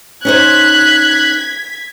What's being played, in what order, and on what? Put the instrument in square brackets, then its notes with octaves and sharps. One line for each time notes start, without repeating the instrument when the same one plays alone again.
[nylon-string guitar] C#4 D#4 C5 [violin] F#6 [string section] G#6 B6